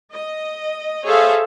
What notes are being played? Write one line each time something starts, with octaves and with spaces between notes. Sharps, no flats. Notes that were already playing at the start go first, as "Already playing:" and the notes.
D#5
G#4 A4 C5 C#5 E5 F5